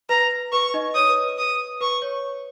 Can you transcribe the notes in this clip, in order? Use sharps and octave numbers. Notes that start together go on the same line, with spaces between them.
B4 A#5
B4 C#6
D#4 D#5
C#5 D#6
B4
B4
D#6
B4 C#6
C#5